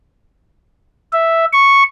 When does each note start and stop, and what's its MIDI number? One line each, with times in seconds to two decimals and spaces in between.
1.13 1.45 76
1.53 1.83 85